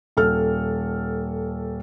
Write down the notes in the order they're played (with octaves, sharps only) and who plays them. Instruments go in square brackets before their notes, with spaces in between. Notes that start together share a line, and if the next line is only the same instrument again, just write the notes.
[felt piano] D#1 A4 F6